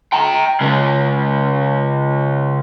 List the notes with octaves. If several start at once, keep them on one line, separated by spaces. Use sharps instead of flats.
G5 A#5
C#3 G#3